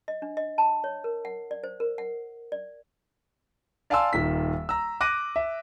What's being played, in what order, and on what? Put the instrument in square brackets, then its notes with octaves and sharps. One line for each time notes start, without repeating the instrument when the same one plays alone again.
[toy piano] D#5
D4
D#5
A5
C#5
A#4
F#5
D5
C5
A#4
F#5
D5
[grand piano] D5 F5 G#5 A5 C6 E6
D#1 D#3 B6
A#5 E6
D6 F#6 A#6 D#7
E5